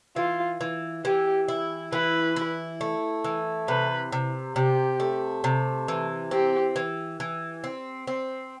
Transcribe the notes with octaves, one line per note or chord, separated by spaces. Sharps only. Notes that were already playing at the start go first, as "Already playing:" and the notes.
E3 F4
E3
E3 G4
E4
E3 B4
E4
A3
E3
C3 B4
C3
C3 G4
A3
C3
E3
C4 G4
E3
E3
C4
C4